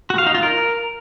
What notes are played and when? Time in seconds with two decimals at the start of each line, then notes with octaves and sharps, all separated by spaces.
0.10 F#4
0.18 F5
0.26 D#4
0.35 F4
0.43 A#4